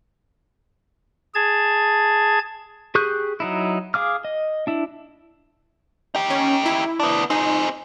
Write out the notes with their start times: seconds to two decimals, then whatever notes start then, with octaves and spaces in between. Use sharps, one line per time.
1.34 G#4 A5 G#6
2.95 G4 G#4 C#6 F#6 G6
3.40 F#3 D#4 E4
3.94 G#4 F5 D6 F6
4.25 D#5
4.67 D4 E4
6.15 D#4 G4
6.30 C#4
6.66 E4
7.00 B3 D4
7.30 C4 D#4 G#4